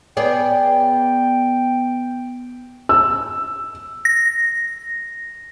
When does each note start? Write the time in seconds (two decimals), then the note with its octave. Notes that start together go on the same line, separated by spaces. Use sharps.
0.17 B3 G#4 D5 G5
2.89 E6
4.05 A#6